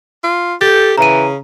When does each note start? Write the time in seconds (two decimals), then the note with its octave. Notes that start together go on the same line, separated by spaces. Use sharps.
0.24 F4
0.61 G4 A4 G6 A6
0.98 C#3 E3 A#5 D#7